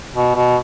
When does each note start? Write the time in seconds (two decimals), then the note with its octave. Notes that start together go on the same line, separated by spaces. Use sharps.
0.15 B2
0.35 B2